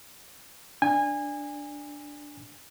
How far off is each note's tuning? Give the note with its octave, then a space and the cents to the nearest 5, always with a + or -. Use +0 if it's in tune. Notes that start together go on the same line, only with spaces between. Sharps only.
D4 +0 G#5 -25